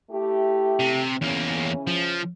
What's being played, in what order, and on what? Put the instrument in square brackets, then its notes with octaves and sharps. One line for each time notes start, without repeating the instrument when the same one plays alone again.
[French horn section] A3 E4 G4
[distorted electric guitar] C3
[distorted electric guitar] E2 A#3 [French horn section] C#3 E3 C#4
[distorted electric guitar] F3